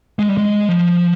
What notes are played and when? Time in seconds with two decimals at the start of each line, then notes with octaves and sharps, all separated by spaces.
0.19 G#3
0.29 G3
0.38 G#3
0.69 F3